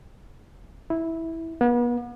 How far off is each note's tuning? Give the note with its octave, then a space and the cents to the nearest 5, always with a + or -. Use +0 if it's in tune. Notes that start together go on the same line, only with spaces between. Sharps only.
E4 -10
B3 -40